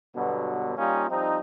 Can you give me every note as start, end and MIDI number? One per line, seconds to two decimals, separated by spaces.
0.15 0.75 43
0.15 0.75 47
0.15 0.75 50
0.15 0.75 54
0.15 0.75 59
0.78 1.05 55
0.78 1.05 58
0.78 1.05 61
0.78 1.05 63
0.78 1.05 65
1.10 1.39 53
1.10 1.39 55
1.10 1.39 60
1.10 1.39 63